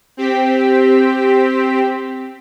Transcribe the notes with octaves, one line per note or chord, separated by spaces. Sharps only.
C4 G4 B6